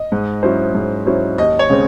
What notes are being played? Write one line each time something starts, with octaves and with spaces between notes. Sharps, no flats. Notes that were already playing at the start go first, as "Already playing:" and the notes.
Already playing: D#5
G#2
F#3 C#4 E4 C5
G#2
F#3 C#4 E4 C5
D#2 D#5
C#5
C#3 G#3 C4